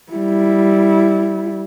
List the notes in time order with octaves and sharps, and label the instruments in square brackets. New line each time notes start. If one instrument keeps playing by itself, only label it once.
[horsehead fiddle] G3 E4